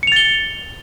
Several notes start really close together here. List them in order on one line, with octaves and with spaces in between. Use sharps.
C#7 F7 A6 G7